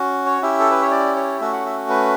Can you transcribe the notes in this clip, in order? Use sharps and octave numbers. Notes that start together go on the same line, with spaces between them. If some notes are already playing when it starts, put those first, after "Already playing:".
Already playing: C#4 F#4
C#5
C#4 E4 G4 E5
A4
B4
C#5
D5
C#5
A3 C#4 F#4 E5
F#5
E5
B4